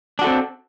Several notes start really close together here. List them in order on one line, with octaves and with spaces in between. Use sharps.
D4 F#4 A4 C4